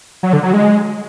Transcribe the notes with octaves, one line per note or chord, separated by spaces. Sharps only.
F#3
D3
F#3
G#3